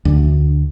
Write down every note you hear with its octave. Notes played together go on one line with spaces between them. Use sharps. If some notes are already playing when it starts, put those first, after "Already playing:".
D2